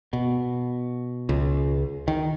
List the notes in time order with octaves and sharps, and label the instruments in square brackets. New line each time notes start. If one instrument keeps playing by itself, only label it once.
[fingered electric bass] B2
C#2
D#3